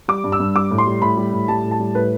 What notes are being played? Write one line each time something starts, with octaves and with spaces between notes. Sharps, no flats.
G3 D6
G2
E6
G2
G3 D6
A2
C6
G3
A2 B5
G3
A2
G3 A5
A2
A5
G3
A2 B4